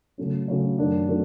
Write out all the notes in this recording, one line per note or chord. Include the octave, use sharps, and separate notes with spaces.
C#3 F#3 A3 C#4
C#3 F#3 A3 C#4
F#2 D#3 F#3 A3 D4
D#3 F#3 A3 D4